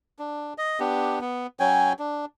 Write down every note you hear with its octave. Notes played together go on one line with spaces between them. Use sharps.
D4
D#5
B3 D4 G4
B3
F#3 C#4 G5 G#5
D4